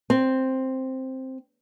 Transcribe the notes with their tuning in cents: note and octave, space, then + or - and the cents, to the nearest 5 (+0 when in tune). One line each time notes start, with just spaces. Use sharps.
C4 +5